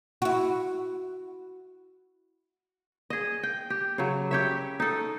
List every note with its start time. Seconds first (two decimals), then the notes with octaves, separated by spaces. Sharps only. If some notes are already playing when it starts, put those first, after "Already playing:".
0.22 E4 F#4
3.10 G#4 D#5
3.43 G5
3.70 G4
3.98 C#3 F#3
4.31 G4 C#5 E5
4.80 D#4 A4